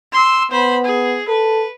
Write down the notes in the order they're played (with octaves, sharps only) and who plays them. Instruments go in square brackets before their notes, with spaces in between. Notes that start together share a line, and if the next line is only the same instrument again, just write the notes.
[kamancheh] C6 E6
[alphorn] B3 [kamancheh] C5 B5
[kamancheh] G#4
[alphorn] A4 [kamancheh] B4